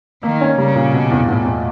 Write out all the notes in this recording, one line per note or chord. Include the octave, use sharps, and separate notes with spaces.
D#3 A#3
C#4
C#3 G3
A#2
B2
E2
E2 A2
E2